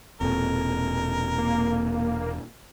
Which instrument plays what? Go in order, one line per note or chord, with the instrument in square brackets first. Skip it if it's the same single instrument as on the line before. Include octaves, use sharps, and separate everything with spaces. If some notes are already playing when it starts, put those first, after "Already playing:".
[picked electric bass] E1 A#2 [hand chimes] C4 A4 A5 [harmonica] A#4
[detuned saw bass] A#3